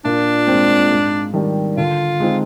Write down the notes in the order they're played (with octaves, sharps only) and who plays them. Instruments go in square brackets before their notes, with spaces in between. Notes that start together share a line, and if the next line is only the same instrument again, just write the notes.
[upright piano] A#2 [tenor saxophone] D4
[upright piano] G#3 C4
G#2
D#3 G3 D4
[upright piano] D3 [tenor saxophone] F4
[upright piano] G#3 C4 D#4